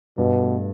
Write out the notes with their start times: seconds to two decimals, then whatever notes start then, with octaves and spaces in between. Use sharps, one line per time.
0.18 G2 B2
0.40 A3